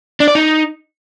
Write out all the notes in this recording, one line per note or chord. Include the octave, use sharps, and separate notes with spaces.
D4
D5
D#4